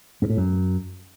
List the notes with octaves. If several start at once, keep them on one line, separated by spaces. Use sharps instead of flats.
G2
A2
F#2